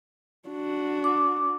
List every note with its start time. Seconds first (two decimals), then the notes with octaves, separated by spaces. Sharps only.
0.49 D4 F#4
1.04 D6